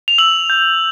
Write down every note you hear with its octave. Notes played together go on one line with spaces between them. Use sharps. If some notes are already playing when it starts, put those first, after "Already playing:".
F7
E6 F#7
G6